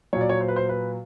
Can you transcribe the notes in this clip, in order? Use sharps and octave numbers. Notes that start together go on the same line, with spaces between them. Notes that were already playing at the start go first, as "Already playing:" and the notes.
A#2 F#3 C#5
D5
C#5
C5
B4
C5
B4